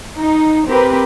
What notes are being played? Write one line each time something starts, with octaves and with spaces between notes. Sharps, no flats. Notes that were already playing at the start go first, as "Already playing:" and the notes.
D#4
C4 G4 A#4 B4